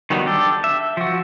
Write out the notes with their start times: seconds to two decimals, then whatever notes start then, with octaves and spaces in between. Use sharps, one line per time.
0.10 D#3 F#3 G3 B3 D#4
0.26 D4 G4 A4
0.64 E5
0.97 F3 F#4